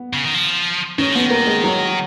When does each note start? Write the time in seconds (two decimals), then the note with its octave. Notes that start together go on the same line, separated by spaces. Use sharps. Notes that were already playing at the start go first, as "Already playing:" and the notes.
Already playing: B3
0.13 C#3
0.24 D#3
0.34 F3
0.98 D#3 C#4
1.12 F3 B3
1.25 D#3
1.30 A#3
1.47 G#3
1.64 F#3